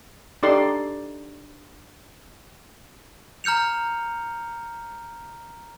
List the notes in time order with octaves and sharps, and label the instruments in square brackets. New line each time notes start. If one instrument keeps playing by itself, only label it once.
[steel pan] D4 D#4 G4 A4 D5 C6
[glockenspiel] A#5 F6 G6 C#7 F7